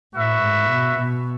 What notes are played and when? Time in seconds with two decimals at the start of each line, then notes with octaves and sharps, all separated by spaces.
0.14 A2 F#4 B4 E5
0.41 G#2
0.69 B2
0.99 B2